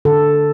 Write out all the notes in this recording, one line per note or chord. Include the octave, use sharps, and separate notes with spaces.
D3 A4